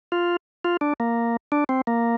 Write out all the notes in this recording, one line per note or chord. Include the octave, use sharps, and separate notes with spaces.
F4
F4
D4
A#3
D4
C4
A#3